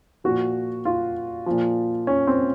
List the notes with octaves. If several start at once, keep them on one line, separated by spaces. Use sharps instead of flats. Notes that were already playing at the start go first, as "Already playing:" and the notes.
A#2 F3 F#4
F4
A#2 F3
C#4
C4